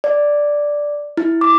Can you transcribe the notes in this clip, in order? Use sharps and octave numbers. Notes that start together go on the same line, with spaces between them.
D5
E4
D6